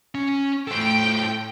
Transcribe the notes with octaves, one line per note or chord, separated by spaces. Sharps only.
C#4
A2 A4 C5 G5